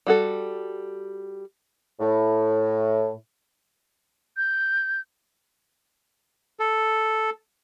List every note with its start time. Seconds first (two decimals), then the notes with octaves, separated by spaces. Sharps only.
0.07 G3 F#4 A4
2.00 A2
4.37 G6
6.60 A4